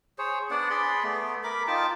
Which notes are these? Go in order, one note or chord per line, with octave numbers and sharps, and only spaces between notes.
G#4 C5 C#5
B3 D4 D5 F#5
G#4 D5 B5 C6
A3 B3
A#4 B5 D6
D#4 F4 G5 A5